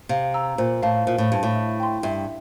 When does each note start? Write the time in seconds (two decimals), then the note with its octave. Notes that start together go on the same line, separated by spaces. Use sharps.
0.09 C3 F5
0.34 A#5 E6
0.58 A#2 C5
0.83 A2 F5 A5
1.07 A#2 C5
1.18 A2
1.31 G2 F5 A5
1.43 A2
1.56 E5
1.80 G5 C6
2.03 G2 E5